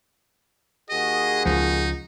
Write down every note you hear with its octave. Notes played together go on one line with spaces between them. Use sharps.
D#2 F#4 G#4 D#5
C#2 F3 D#4